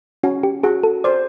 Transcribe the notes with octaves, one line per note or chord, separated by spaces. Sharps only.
C#4 F#4
G4
F#4 G#4
A4
C5 D5